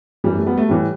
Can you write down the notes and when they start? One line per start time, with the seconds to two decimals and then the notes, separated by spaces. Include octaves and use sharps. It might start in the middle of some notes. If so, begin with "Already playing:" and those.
0.24 F#2 E3 G3
0.36 A3
0.46 G3 B3
0.57 A3
0.69 A2 E3 G3